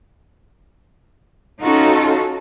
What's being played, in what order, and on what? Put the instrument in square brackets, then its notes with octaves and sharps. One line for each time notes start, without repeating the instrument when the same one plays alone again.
[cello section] C#4 D#4 F4 F#4 A4